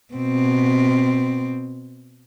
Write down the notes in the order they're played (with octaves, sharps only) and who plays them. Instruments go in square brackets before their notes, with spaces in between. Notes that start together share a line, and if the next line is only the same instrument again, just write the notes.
[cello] B2 C4